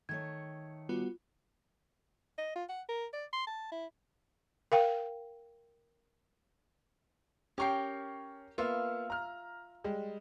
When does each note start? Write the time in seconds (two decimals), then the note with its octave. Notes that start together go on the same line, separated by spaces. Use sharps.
0.09 D#3 A3 C#5 G#6
0.89 G3 B3 F4 F#4
2.38 D#5
2.56 F4
2.69 F#5
2.89 A#4
3.13 D5
3.33 C6
3.47 A5
3.72 E4
4.72 A#4 F5 G5
7.58 C#4 G4 A#4 G5 C#6 C7
8.58 A#3 B3 F4 E5 F5
9.10 A#5 F6
9.84 G3 G#3